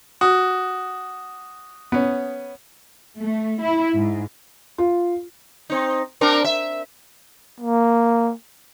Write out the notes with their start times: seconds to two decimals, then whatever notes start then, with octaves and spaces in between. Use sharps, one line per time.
0.21 F#4 D#6
1.92 B3 C#4
3.19 A3
3.61 E4
3.96 G#2
4.78 F4
5.70 C4 D#4
6.21 C4 D4 A#4
6.44 E5
7.60 A#3